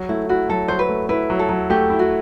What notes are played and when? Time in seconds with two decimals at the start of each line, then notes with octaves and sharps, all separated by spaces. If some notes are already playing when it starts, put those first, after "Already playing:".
Already playing: F#3
0.09 A3 E4
0.29 E4 F#4
0.49 F#3 A4
0.68 F#3 C5
0.79 B4
0.89 A3
1.09 E4 B4
1.30 F#3
1.39 A4
1.49 F#3
1.70 A3 G4
1.90 E4
1.99 F#4